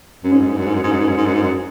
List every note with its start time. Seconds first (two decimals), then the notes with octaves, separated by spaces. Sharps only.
0.24 F#2 C#4
0.32 G#2
0.41 F#2
0.49 G#2
0.58 F#2
0.66 G#2
0.74 F#2
0.83 G#2
0.92 F#2
1.00 G#2
1.08 F#2
1.17 G#2
1.25 F#2
1.34 G#2
1.42 F#2